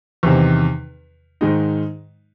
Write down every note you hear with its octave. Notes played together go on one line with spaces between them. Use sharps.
E2 C3 D#3
G#2 D#3 G#3 D#4